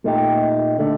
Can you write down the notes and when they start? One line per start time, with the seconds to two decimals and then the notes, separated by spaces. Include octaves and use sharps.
0.04 A#2 A3 D#4 G4
0.79 D3 A3